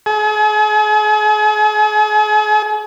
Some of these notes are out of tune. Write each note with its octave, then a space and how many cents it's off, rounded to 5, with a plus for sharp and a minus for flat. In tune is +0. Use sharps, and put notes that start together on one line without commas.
G#4 +40